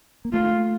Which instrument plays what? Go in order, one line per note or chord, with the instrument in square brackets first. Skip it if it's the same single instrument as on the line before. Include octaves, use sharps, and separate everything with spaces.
[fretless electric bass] A#3
[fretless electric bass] A3 [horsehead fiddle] F4